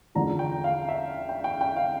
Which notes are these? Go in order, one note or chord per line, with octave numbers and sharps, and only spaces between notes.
E2 D3 F3 A#5
G5
F5
E5
G5
G5
G5
F5